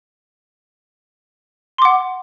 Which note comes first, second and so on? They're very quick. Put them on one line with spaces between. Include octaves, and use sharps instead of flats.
C6 D6 F#5